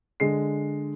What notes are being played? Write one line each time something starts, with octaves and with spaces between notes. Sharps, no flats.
D3 G#3 C7